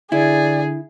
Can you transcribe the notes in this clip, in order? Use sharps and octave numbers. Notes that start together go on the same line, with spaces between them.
D3 E4 G#4 D5